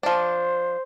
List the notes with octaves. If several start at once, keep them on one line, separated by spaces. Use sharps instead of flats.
F3 D4 C5